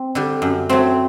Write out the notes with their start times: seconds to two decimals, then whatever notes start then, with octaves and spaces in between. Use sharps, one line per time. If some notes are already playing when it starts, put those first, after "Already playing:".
Already playing: C4
0.15 D3 G3
0.42 F#2
0.69 F#3 A3 C4